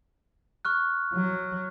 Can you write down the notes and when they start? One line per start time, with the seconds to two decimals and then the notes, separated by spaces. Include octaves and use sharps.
0.65 C#6 F6 F#6
1.14 F#3